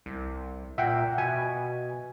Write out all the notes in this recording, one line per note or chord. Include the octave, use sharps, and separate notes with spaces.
C2
A#2 E5 F#5 G5
B2 G#5